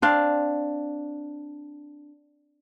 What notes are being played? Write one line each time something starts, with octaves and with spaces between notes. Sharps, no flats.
C4 D4 F5